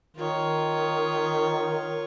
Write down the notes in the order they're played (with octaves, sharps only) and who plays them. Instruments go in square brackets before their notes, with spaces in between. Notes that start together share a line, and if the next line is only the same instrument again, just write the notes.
[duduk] D#3 [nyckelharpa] F4 C#5